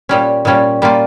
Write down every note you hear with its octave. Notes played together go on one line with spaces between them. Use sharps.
A#2 G3 C#4
A#2 G3 C#4
G3 A#3 F4